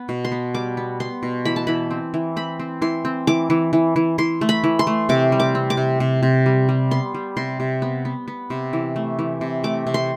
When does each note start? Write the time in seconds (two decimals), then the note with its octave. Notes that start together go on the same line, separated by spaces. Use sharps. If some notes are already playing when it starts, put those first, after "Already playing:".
Already playing: B3
0.09 B2
0.25 C6
0.32 B3
0.54 G3 D6
0.77 B3
1.00 B3 C6
1.23 B2
1.45 E3 B5
1.56 A5
1.67 E3 B5
1.91 C4
2.14 E3
2.36 C4 B5
2.60 C4
2.82 E3 C6
3.05 C4
3.27 E3 D6
3.50 E3
3.73 E3
3.96 E3
4.18 E3 C6
4.41 A3
4.49 B5
4.64 E3
4.79 C6
4.87 A3
5.09 C3 D6
5.32 G3
5.40 D6
5.55 C4
5.70 D6
5.77 C3
6.00 C3
6.23 C3
6.46 G3
6.69 G3
6.91 B3 C6
7.14 G3
7.37 C3 C6
7.60 C3
7.82 B3
8.05 B3
8.28 B3
8.50 C3
8.73 E3
8.96 A3
9.19 E3
9.41 C3
9.64 A3 D6
9.87 C3
9.94 C6